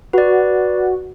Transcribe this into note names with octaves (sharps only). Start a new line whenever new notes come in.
F#4 B4 D5